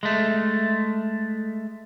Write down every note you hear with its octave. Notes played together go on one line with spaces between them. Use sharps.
G#3 A3